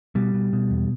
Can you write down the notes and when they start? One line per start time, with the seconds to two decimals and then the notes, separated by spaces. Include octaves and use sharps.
0.15 B2 G3
0.34 B2
0.53 B2
0.71 E2